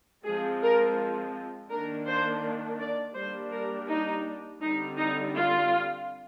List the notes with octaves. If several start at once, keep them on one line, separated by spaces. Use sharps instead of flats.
F3 G#3 C4 G#4
A#4
D#3 A#3 D4 A#4
C5
D5
G3 A#3 D4 C5
A#4
D#4
D3 G3 C4 D#4
D#4
F4